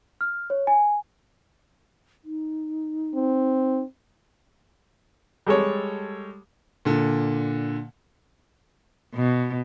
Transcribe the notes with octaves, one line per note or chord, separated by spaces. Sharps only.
F6
C#5
G#5
D#4
C4
G3 G#3 A4 C#5
A#2 D3
B2